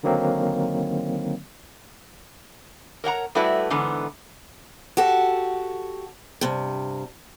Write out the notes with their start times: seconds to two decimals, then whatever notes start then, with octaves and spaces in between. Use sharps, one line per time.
0.03 D3 D#3 F#3 A#3 C4 D#4
3.04 A#4 C#5 F#5 A#5
3.35 G3 A3 E4 F#4 B4 D5
3.70 G#2 D3 E3 B3
4.97 F#4 G4 A4
6.41 G2 C3